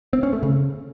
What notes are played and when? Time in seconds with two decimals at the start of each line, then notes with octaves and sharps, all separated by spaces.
0.13 C4
0.23 C#4
0.33 A3
0.43 C#3